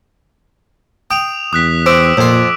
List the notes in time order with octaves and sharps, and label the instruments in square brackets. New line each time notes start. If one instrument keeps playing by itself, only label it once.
[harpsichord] G5 [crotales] D#6 F7
[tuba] E2 [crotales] D#6 F#6 B6
[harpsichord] C4 [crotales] D6 E6 D7
[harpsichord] F2 F4 [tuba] A#2